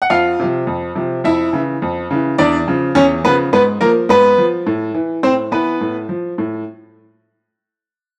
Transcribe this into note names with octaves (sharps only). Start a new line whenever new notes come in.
F#5
F2 F4 F5
C3 F3
F2
C3 F3
F2 E4 E5
C#3 E3
F2
C#3 E3
E2 D4 D5
C#3 F3
E2 C#4 C#5
C#3 F3 B3 B4
G#2 B3 B4
F3 A#3 A#4
G#2 B3 B4
F3
A2
E3
A2 C4 C5
E3 B3 B4
A2
F3
A2